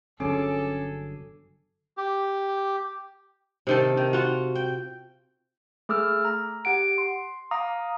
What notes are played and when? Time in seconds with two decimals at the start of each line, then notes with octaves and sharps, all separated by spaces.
0.20 G1 D3 F#3 C#4 G#4 A4 D6
1.97 G4
3.67 C3 D#3 A4
3.97 D#3
4.13 F4 F#4
4.55 G5
5.89 A3 G#4 D6 E6 F6
6.25 A#5
6.65 G4 F#5 D7
6.98 C6
7.51 F5 A#5 D6 D#6